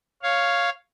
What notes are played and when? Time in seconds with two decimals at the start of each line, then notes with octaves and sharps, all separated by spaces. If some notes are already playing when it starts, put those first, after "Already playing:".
0.22 C#5 F5